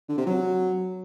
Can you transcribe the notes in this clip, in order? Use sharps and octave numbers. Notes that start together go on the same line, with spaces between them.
D3
C3
F#3